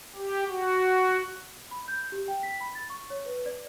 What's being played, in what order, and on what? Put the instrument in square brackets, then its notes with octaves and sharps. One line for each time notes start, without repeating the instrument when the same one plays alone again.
[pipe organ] G4
F#4
[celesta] B5
G6
G4
G5
B6
B5
A6
C#6
C#5
B4
D5